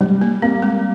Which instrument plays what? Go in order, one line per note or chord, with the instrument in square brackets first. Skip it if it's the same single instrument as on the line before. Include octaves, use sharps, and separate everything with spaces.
[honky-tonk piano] G3 [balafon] G#3
[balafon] A#3
[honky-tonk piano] A#3 [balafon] C4
[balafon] G#3